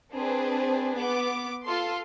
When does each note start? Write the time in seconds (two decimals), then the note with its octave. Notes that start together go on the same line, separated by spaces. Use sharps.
0.13 C4 D4 G#4 B4 C5
0.97 B3 D6
1.66 F4 A4 C6